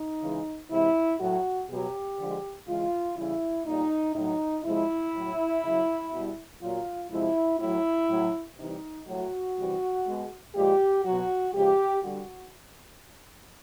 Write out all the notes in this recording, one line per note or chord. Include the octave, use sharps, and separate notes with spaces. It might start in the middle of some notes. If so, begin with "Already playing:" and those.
Already playing: D#4
C#3 E3 G#3
C3 E3 G#3 E4
A2 F#3 F#4
B2 F#3 G4
D3 F3 G#3
C#3 E3 G#3 F4
C#3 E3 G3 E4
A#2 G3 D#4
A2 F#3 D#4
C3 F3 G#3 E4
A2 F#3
C#3 F#3
B2 G3
A#2 F#3 F4
C3 F3 G#3 E4
A2 F#3 E4
A2 F#3
C3 E3 G3 D#4
A2 F#3 F#4
C3 E3 G3
B2 G#3
A#2 F3 G#3 G4
B2 F#3 F#4
C#3 F3 G#3 G4
D3 G3 F#4